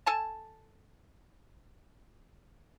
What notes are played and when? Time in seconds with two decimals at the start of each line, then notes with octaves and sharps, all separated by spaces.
0.06 A4 G#5 A5